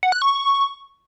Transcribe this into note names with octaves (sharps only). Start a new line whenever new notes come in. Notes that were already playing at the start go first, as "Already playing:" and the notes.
F#5
F#6
C#6